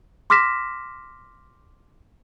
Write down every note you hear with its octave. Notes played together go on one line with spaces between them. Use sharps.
C6 D6 F6 A#6 B6 E7